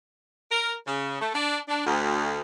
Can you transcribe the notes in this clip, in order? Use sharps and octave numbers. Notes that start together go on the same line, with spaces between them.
A#4
C#3
A3
D4
D4
D2